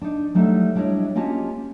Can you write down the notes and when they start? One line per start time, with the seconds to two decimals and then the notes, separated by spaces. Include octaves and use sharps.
0.02 D4 D#4
0.34 F#3 G3 A3 D#4 A4 E5
0.75 G3 D4 E4 C#5 D#5
1.15 A#3 C#4 F4 G4 D#5 A5